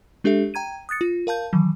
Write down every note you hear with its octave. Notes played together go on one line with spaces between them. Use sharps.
G#3 D4 G4 A4 E5
G5 A#5 G#6 D#7
D#6 F#6 A6 C#7
F4
A#4 F5 A5 G6
D#3 E3 F#3